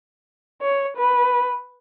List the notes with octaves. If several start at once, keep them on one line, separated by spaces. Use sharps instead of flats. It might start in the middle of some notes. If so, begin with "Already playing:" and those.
C#5
B4